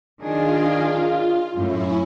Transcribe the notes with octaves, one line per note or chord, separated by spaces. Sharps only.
D#3 D4 F4 G#4
F#2 A2 C#4 E4